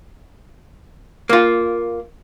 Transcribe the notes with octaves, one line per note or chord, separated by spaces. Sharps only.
A#3 F4